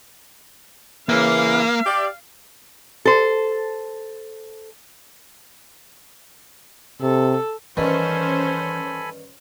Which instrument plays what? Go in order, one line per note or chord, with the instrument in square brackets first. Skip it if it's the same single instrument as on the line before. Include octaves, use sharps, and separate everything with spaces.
[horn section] C#3 E3 [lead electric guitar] A#3 [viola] F5
[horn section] G4 D5
[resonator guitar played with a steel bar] A4 C5
[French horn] C3 [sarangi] A4
[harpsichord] G2 D#3 [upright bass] E3 [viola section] C#4 C5 [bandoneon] A4 G#5 B5